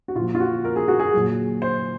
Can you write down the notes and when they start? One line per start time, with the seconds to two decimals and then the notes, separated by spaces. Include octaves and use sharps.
0.08 F#4
0.15 A#2 F4
0.20 F3
0.35 F4
0.40 F#4
0.65 A#4
0.76 G#4
0.88 F#4
1.00 G#4
1.14 A#2 F#3
1.62 C5